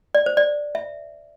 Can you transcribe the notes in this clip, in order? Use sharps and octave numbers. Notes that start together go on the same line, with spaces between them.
D5
C5
D5
E5